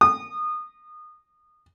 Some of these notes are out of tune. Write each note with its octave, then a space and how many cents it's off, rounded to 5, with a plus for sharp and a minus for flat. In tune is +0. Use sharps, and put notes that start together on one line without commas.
D#6 -25